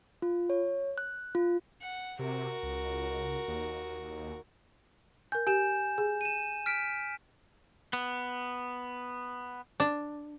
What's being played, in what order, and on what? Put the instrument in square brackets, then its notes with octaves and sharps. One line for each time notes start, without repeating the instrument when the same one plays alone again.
[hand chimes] F4
C#5
F#6
F4
[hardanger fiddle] F#5
[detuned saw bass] C3 [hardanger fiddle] F#4 A#4
[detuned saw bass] C#2
D#2
[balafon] A#4 G#5 [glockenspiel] G6
[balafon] G4 [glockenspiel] G#5 G6 E7
[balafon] G#4
[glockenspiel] D#7 E7
F6 B6 D7
[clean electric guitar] B3
[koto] D4